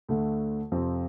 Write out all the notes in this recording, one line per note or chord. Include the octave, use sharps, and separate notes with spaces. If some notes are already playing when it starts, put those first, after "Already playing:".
D2 D3 A3
F2 C3 F3 C4